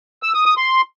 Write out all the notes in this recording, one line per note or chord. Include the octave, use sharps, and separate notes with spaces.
E6
D#6
D#6
C6